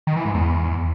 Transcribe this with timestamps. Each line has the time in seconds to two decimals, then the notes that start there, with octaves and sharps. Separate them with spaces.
0.07 D#3
0.16 E3
0.25 G#2
0.34 E2